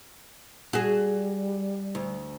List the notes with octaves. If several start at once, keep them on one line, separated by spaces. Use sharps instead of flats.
G3 F#4 G#4
D2